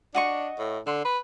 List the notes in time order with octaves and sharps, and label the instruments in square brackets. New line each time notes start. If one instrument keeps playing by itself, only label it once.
[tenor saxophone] D4 [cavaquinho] F#4 D#5 C#6
[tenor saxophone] A2
[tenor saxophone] D3 [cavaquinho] C6
[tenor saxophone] B4